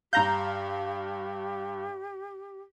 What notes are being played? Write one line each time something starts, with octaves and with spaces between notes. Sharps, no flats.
G2 G4 F5 A#5 G6